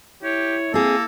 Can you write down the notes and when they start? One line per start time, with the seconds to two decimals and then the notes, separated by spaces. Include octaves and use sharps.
0.23 E4 G4 C#5
0.74 A#3 C4 G#4 A4